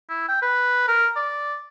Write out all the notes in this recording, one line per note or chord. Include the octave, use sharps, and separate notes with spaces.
E4
G5
B4
A#4
D5